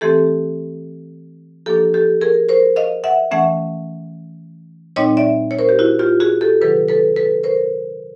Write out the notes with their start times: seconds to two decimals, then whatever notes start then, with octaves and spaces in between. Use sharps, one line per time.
0.01 E3 A3 C4 G4 A4
1.66 F3 A#3 D4 G4 A4
1.94 G4 A4
2.21 G#4 A#4
2.49 A#4 C5
2.76 D#5 F5
3.04 E5 F#5
3.31 E3 A3 C#4 E5 F#5
4.96 A#2 G3 C4 D#4 C#5 D#5
5.17 D5 E5
5.51 C#5
5.59 A#4 C5
5.69 G4
5.79 E4 F#4
5.99 F4 G4
6.20 F#4 G#4
6.41 G4 A4
6.61 C3 D#3 F#3 A4 B4
6.89 A4 B4
7.16 A4 B4
7.43 A#4 C5